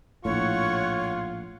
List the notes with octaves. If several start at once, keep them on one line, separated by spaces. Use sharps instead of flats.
A#1 A2 F4 C#5 F#5 C#6